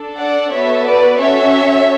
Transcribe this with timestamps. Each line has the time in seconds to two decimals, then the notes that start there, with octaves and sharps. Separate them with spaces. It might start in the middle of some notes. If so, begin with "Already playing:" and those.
Already playing: D4 A4
0.17 D5 F#5
0.51 B3 F#4 A4 C#5 E5
0.85 B4 D5
1.19 C#4 F#4 A4 C#5 E5